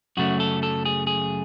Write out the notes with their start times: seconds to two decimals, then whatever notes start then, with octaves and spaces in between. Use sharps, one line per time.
0.17 F#2 C#3 F#3 A3 C#4 F#4
0.40 A4
0.63 A4
0.85 G#4
1.07 G#4